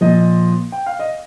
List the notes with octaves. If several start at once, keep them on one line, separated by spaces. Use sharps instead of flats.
A#2 F3 D#5
G5
F5
D#5